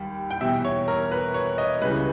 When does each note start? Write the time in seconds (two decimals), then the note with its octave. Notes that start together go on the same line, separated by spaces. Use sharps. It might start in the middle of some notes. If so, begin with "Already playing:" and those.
Already playing: D#2 G3 G5
0.31 G5
0.41 E2 B2 G3 E5
0.65 C#5
0.88 A#4
1.12 B4
1.34 C#5
1.58 D#5
1.82 C#2 C#3 E3 G3 B4